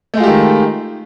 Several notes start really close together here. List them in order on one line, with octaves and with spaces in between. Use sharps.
A3 G#3 F4 G4 D#3